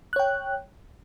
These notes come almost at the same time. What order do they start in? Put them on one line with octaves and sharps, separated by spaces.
F#6 C#5 G5